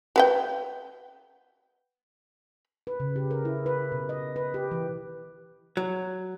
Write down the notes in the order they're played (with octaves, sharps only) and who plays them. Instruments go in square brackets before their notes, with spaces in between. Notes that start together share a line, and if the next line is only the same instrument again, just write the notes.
[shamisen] F#4 B4 G5
[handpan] B4
C#3
G4
A#4
E4
B4
B2
D#5
B4
G4
E3
[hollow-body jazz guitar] F#3